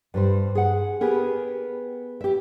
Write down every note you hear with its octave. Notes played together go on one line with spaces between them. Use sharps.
G2 G3 C5
G#4 F#5
B3 G4 G#4 A#4
G4 E5